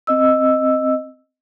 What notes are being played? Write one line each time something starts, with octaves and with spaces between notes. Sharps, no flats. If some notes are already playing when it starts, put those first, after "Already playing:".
C4 D#5 E6